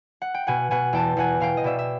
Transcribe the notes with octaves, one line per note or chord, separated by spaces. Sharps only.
F#5
G5
B2 F#5 G#5
B2 F#5 G#5
E2 G5 A5
E2 F#5 G#5
B2 F5 G5
D#5
B2 D5 E5
E5